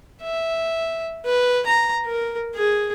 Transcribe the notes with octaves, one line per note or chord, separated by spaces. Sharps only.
E5
B4
A#5
A#4
G#4